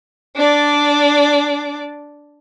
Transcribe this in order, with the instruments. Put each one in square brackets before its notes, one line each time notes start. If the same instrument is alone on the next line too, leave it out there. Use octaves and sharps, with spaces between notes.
[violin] D4 D5